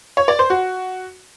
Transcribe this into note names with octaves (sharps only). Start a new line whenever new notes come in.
C#5
D5
C5
F#4